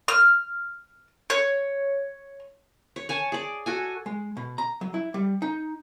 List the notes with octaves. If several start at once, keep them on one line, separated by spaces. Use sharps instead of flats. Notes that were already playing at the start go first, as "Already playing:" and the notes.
F6
C#5
C#5
C#5 G#5 A5
G#4 D5
F#4 A4 G#5
G#3
B2
A#5
F#3
E4
G3
D#4